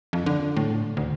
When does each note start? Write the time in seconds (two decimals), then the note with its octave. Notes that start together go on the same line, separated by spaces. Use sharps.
0.13 F2
0.26 D3
0.56 A2
0.97 D2